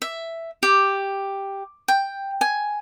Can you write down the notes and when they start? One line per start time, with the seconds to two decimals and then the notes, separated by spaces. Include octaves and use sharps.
0.02 E5
0.63 G4
1.88 G5
2.41 G#5